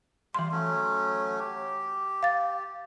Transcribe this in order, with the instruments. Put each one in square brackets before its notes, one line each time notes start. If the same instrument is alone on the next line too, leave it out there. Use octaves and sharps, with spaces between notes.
[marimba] E3 C6 [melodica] G3 F5
[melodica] F#3 A3 C#4
G4
[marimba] F5 A6